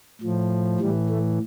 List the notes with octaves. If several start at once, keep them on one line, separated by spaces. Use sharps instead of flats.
A2 F3
A2 E3 G3
A3